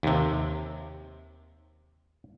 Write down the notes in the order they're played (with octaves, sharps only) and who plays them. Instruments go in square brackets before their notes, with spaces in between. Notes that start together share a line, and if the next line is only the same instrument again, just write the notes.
[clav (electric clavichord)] D#2 C3